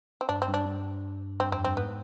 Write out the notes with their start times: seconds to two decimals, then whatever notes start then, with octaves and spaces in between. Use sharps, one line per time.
0.21 C4
0.29 G2 D4
0.42 C4
0.48 G2
0.54 D4
0.66 G2
1.40 G2 C4
1.52 F2 C4
1.64 G2 C4
1.77 G#2 B3